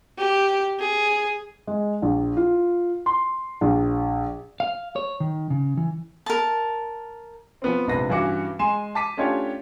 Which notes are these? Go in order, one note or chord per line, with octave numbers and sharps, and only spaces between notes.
G4
G#4
G#3
A#1
F4
C6
A#1
F5
C#5
D#3
C#3
E3
A#4 A5
F3 B3 C4
A#1 G#2 C3 D4 B4 A#6
G2 E3 C#4 F#4 D6 C#7
G#3 G#5 C6 E7
A5 D6 B6 D#7
A3 C#4 D4 F4 G4 C#5